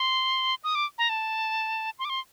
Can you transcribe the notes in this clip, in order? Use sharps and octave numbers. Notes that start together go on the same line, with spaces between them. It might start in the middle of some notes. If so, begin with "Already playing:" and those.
Already playing: C6
D#6
D6
A#5
A5
C6
D6
C6